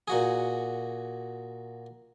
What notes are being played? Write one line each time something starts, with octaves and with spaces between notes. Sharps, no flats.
A#2 F#4 G#4